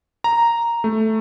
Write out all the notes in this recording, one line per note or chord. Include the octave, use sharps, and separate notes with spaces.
A#5
A3